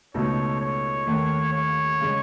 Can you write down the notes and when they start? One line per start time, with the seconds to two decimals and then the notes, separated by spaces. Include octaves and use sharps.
0.14 C#2 B2 A3 D#4 A4 C#5
0.60 C#5
1.07 D#2 D#3 A3
1.52 C#5
2.01 C#3 G#3 C#4